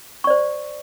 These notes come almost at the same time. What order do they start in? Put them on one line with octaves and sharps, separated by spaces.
C#6 D5 C5